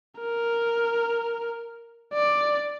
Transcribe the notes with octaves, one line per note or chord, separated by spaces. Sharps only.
A#4
D5